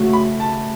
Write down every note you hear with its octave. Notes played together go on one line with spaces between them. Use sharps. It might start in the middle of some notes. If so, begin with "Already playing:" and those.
Already playing: C#3 A3 F#4
B5
A5